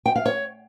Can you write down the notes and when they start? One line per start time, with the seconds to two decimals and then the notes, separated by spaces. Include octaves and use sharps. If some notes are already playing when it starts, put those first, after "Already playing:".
0.06 G5
0.16 F5
0.26 C#5